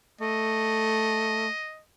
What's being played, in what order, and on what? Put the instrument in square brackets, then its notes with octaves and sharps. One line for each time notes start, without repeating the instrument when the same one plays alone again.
[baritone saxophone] A3 [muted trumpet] D#5